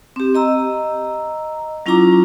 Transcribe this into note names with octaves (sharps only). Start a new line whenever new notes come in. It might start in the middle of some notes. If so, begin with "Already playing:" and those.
C4 G4
D#5 A#5 E6
F#3 C#4 E4 F4 A#5 D6